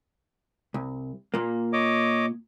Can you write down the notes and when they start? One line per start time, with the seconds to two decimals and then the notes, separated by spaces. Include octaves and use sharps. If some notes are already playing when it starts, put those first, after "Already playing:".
0.74 C2
1.34 A#2 A#3
1.73 C#5 D#5 D6